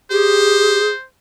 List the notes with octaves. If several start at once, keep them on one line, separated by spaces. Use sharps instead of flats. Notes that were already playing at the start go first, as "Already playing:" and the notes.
G4 G#4 C5